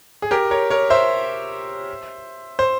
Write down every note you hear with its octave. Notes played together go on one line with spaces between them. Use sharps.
G#4
G4 A#4
A#4 C#5
A#4 C#5
C5 E5
C5